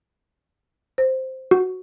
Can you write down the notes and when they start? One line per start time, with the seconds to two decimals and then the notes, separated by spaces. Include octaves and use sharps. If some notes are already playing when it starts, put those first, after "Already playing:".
0.98 C5
1.51 F#4